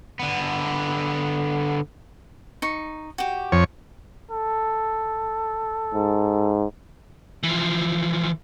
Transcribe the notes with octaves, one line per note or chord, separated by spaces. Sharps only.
D3 B3
D#4 C#6
F#4 G4
F2 C#5
A4
G#2
E3 F3